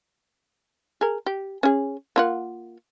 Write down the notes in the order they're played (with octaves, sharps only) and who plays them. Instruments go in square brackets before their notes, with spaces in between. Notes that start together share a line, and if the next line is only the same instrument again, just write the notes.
[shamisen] G#4 A#4
G4
C#4 G#4
A#3 F4 F#5